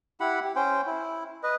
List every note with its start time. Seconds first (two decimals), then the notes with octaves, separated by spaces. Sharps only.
0.20 E4 G4 F#5 B5
0.44 G4
0.56 C#4 C5 G5
0.87 E4
1.43 B4 D#5